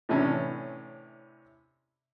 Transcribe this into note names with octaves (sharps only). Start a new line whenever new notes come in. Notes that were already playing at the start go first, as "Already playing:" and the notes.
A2 C3 E3 C#4 D4